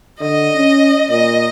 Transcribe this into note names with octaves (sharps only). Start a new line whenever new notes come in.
D3 D#5
C#4
A#2 D#5